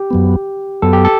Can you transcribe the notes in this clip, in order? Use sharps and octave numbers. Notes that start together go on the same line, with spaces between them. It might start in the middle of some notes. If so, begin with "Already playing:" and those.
Already playing: G4
F#2 F#3 B3
F#2 F#3 B3 A4
G4
A4